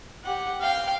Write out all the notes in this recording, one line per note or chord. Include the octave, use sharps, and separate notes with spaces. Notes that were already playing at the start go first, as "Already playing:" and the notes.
G4 F#5
F5 G5